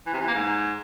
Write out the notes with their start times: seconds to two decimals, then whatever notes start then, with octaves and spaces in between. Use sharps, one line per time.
0.06 E3
0.13 C3
0.20 E3
0.27 A#3
0.34 G#2